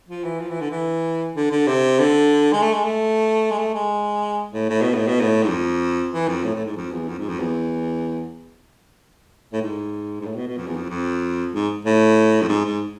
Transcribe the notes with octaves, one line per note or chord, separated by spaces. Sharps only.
F3
E3
F3
E3
D3
E3
D3
D3
C3
D3
G#3
A3
G#3
A3
G#3
A3
G#3
A2
A2
B2
A2
B2
A2
G#2
F2
E3
F2
A2
A2
G#2
F2
E2
F2
G#2
F2
E2
A2
G#2
G#2
A2
B2
B2
F2
E2
F2
F2
G#2
A2
F2
G#2
G#2